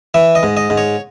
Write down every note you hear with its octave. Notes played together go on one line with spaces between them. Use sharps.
E3 E5
D#5
G#2
D#5
G#2
C#5